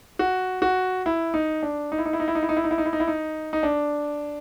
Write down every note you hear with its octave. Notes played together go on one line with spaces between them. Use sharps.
F#4
F#4
E4
D#4
D4
D#4
E4
D#4
E4
D#4
E4
D#4
E4
D#4
E4
D#4
E4
D#4
E4
D#4
E4
D#4
D#4
D4